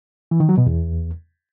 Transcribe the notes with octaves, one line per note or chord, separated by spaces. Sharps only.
E3
D#3
F#3
B2
E2